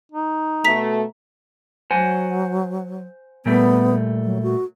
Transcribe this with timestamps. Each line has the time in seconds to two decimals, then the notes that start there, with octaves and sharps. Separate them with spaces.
0.12 D#4
0.64 B2 A3 A#5 B6
1.91 F#3 C5 F#5 G#5
3.46 A#2 G3 A3 B3
4.23 F#3
4.43 F#4